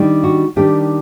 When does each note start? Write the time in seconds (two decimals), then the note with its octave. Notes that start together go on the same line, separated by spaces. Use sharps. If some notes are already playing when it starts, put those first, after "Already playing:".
Already playing: D#3 G3 D4
0.24 F#4
0.56 D#3 G3 D4 G4